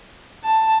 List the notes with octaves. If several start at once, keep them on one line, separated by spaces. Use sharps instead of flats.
A5